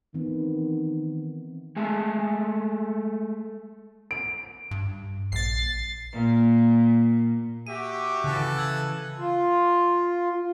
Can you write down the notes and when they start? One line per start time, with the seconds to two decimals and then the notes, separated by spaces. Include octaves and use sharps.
0.14 D#3 E3 B3 C4
1.76 G#3 A3 G#4 A4 G#5 A5
4.11 D7
4.71 G2
5.32 A#1 A6 C7
6.13 A#2
7.67 F#4 G4 E5 D#7
8.24 C#3 E3 A4 F#6
8.57 E6 G#6 F#7
9.18 F4